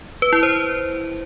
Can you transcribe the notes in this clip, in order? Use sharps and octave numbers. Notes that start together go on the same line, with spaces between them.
B4
E4
C5